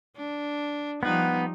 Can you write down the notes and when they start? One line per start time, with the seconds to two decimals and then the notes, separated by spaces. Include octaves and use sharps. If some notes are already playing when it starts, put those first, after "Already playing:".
0.16 D4
1.03 F3 G3 B3 D#4 F#5